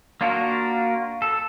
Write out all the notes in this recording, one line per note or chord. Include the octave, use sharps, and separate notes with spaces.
A#3 D4 F4 F#4 A#4
A4